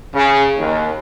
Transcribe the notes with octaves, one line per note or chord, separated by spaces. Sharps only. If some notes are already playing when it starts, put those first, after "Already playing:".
C#3
D#2